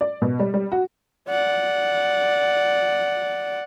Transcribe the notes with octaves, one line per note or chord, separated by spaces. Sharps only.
D5
B2
G3
G3
F#4
D5 F#5